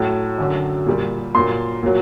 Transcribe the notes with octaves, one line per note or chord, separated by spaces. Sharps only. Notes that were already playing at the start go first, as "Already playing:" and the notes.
Already playing: A2 F#3
F#2 D3 F#3
A#2 G3
A#2 F#3 C6
A#2 F#3